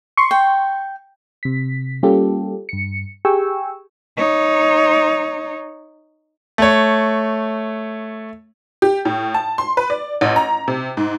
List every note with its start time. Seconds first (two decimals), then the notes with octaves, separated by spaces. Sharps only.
0.17 C6 C#6
0.31 G5
1.43 C3 B6
2.03 G3 A#3 C#4 F4 G4 A4
2.69 G2 C#7
3.25 G4 G#4 G5 G#5 C#6 E6
4.17 D#4 C#5
6.58 A3 C#5
8.82 G4
9.05 A2
9.34 A5
9.58 C6
9.77 B4
9.90 D5
10.21 A1
10.36 A#5
10.68 C3
10.97 G#2